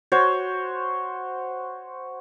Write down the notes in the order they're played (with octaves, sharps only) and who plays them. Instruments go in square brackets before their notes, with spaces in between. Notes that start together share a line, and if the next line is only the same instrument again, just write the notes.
[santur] F#4 C5 C#5